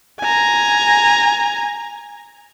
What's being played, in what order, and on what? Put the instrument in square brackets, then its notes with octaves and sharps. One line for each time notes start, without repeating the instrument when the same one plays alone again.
[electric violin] G#5 A#5